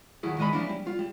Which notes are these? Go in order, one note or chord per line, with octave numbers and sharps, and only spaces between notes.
D#2 F#3 E4 G#4
D#3 G#3 D#5 E5 B5
F3 G#3 A#3 C#4 D4 E4
G3
F4
G3